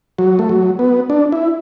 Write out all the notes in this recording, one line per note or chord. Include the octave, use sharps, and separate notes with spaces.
F#3
A3
F#3
B3
D4
E4